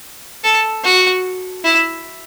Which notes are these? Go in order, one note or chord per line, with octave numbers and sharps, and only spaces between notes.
A4
F#4
E4